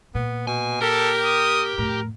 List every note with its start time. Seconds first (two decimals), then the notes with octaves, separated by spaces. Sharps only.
0.15 A#2 B3
0.47 B2 G#5
0.81 G4 A4 A#4 G5
1.24 D#6
1.78 F2 A2 A#4